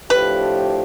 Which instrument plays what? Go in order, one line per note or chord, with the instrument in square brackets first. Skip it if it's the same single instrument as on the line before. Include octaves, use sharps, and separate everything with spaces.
[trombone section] A2 F3 A3 D4 G4 [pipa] B4